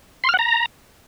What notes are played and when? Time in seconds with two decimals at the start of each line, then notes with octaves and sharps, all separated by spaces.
0.24 C6
0.29 F6
0.34 F#5
0.39 A#5